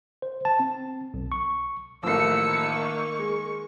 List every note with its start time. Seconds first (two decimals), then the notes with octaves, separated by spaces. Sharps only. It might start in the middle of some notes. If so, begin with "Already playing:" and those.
0.22 C5
0.45 A5
0.60 C4
1.14 B1
1.32 C#6
2.03 A1 D#3 F3 A#3 E6 C#7
2.74 C#6
3.19 G#3